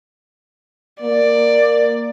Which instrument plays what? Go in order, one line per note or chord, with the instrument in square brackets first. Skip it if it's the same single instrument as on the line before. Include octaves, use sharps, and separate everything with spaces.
[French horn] A#3 [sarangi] D5